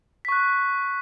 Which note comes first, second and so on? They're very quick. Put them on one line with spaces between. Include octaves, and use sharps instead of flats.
B6 C#6 F#6